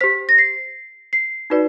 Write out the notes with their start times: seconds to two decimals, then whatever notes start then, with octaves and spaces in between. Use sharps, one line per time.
0.01 G4 C5 B6
0.29 A#6
0.38 C7
1.13 C7
1.50 D#4 F#4 B4 D5